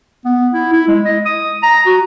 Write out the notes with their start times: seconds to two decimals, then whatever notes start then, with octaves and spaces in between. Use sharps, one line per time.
0.25 B3
0.53 E4
0.73 E4
0.88 G#3
1.05 D#5
1.25 D#6
1.63 A#5
1.86 F#4